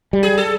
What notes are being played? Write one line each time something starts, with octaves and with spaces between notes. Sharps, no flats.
G3
G#4
A4